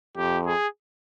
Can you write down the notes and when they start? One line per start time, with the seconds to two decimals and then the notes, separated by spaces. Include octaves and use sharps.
0.17 F2 G4
0.46 G#4